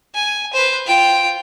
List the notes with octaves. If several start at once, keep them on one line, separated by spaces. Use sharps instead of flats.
G#5
B4 C5
F4 G5